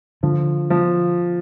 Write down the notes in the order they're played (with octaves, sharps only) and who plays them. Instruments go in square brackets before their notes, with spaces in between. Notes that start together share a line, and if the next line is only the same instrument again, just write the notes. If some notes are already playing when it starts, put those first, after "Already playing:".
[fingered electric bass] D3 [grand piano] F3
[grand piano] F3